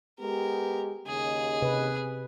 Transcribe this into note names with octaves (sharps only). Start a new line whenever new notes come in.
G#3 B3 G4 A#4
D#2 C#3 G#4 D#5
C3 B4